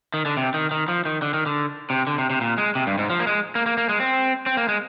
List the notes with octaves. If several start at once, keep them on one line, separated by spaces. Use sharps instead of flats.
D#3
D3
C3
D#3
D#3
F3
D#3
D3
D#3
D3
C3
D3
C3
C3
A#2
G#3
C3
G2
G#2
F3
A#3
G#3
A#3
A#3
A#3
G#3
C4
C4
A#3
G#3